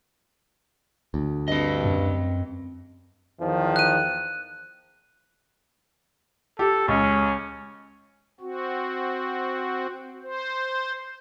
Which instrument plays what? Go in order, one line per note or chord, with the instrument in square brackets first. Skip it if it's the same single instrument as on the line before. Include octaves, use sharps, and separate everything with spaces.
[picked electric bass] D2
[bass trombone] G2 [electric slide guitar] C4 D#5
[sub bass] F#2
[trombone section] E2 D#3 F3
[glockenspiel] F#6 D#7
[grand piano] G4 [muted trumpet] A4
[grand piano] C#2 [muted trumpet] C#4
[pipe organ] C4 F#4
C5